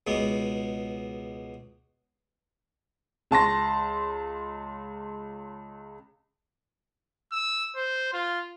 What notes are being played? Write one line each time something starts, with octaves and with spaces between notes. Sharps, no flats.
C#2 B2 G#3 B3
C#2 A5 C6 A#6
E6
C5
F4